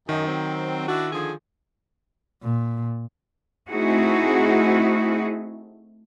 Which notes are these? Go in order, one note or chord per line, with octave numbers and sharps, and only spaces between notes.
F#2 D#3 D#4
F#3 C4
D4 E4 F#4
D3 F3 G#4
A#2
A3 C4 D#4 E4 F#4 G#4